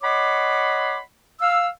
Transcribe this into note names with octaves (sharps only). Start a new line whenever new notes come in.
C#5 D#5 F#5 B5 C6 D6
F5 E6